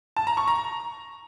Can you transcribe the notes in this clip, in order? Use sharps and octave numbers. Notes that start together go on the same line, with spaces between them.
A5
A#5
C#6
A#5